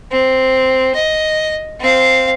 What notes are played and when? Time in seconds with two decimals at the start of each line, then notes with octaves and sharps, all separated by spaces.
0.11 C4
0.95 D#5
1.80 C4 F5